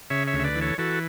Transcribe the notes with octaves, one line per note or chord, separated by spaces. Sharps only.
C#3 C#5 E5
C#5 E5
D2
E5
B4 D5
E3
A4 C#5
E3 F#4 A4